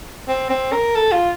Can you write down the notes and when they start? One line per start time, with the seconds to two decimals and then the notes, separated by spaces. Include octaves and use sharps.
0.28 C4
0.50 C4
0.72 A#4
0.95 A4
1.12 F4